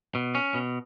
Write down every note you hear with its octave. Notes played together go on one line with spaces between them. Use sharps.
B2
C#4
B2